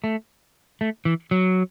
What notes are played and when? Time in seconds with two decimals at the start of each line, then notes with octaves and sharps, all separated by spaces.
0.04 A3
0.81 A3
1.05 E3
1.31 F#3